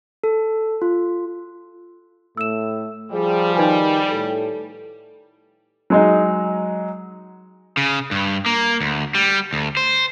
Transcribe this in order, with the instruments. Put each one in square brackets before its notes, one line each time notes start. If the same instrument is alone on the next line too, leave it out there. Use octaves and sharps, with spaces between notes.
[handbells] A4
F4
[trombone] A2 [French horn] A3 [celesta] E6 E7
[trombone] F3 [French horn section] G3 [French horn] G#4
[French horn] D#3 [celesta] D#4 B4 G#5
[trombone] A2 [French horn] A4
[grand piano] F#3 G#3 D#4
[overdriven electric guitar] C#3
G2
A#3
D2
G3
D2
C5